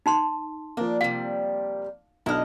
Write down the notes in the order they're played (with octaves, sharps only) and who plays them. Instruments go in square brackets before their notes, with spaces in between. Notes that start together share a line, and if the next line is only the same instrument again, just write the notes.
[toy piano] D#4 A5 C6
[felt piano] F3 A#3 [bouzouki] D4
[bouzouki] C3 G3 [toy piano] F5
[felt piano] B1 D4 F6 [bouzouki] E4 D#5